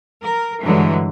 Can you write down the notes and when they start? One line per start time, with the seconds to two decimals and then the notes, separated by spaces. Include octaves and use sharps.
0.20 A#4
0.63 G2 D3 E3 F#3 G#3